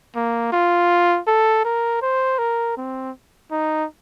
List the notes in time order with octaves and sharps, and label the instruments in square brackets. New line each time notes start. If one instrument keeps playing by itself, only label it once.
[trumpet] A#3
F4
A4
A#4
C5
A#4
C4
D#4